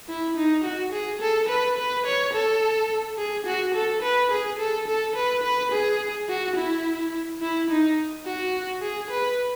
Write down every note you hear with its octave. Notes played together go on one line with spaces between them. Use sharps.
E4
D#4
F#4
G#4
A4
B4
B4
C#5
A4
G#4
F#4
A4
B4
G#4
A4
A4
B4
B4
G#4
F#4
E4
E4
D#4
F#4
G#4
B4